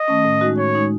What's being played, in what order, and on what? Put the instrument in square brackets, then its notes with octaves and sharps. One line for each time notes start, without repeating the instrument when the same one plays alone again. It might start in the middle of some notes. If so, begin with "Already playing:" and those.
Already playing: [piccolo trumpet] D#5
[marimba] D#3 A3 C#4
A2
G#3 D#4 F#4
[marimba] A2 [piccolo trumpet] C#5
[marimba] G#3 D#4